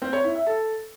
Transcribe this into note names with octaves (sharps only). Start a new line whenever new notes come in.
C4
C#5
E4
E5
A4